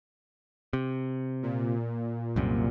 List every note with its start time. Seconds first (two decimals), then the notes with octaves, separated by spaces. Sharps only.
0.73 C3
1.43 A#2
2.36 C2 F#2 C3